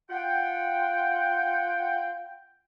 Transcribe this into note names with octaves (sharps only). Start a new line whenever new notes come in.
F4 F#5 G5